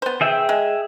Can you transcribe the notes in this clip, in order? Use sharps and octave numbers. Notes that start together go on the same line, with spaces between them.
B3 C5
G#4 E5 G5
G#3